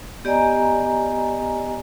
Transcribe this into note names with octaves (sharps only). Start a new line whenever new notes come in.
B3 G4 D5 D#5 G#5 A#5